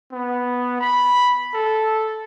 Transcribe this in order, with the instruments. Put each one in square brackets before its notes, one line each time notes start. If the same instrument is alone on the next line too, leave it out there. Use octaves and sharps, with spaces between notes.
[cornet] B3
B5
A4